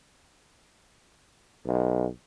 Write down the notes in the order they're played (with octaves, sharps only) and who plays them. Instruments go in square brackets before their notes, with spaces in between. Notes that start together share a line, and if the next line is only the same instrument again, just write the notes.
[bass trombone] B1